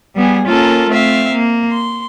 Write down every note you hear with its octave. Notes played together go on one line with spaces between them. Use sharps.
G3 B3 G#4
A#3 C#4 F4 A4 A#4
A3 C4 E5 F5
A#3
C6